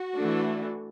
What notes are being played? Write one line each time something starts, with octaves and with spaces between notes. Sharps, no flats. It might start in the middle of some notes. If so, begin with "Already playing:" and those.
Already playing: F#4
E3 A3 D4